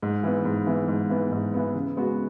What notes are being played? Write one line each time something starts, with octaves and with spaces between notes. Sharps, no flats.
G#2
E3 B3
G#2
E3 B3
G#2
E3 B3
G#2
E3 B3
C#3
G#3 B3 F#4